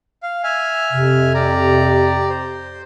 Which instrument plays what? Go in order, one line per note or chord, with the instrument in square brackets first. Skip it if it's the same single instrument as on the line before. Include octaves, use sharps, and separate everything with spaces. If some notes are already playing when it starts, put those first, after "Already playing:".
[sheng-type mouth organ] F5
E5 G#5 F6
[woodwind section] F2 C3
[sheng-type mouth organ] G4 D5 A#5
C5